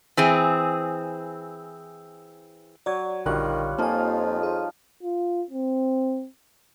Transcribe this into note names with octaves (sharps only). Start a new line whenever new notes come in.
E3 C4 G#4
F#3 D5 G#6
A#1 D3 D#3 G3 F4 C#5 F#6
F2 F3 A#3 D#4 F4 G#5
G#4
F4
C4